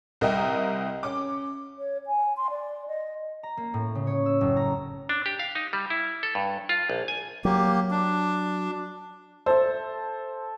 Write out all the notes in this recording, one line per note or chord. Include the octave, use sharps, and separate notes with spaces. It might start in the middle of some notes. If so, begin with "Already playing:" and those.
C2 A#4 D#5 E5 G5
C#4 D6
C#5
G#5
C6
D5
D#5
A#5
A#3
A2
C#3
C#5
E6
F#1
A#5
D4
G4
F5
D#4
G3
E4
A4
G2
F4
A#1
G#5
F#3 A#3 G4
D4
A4 C5 E5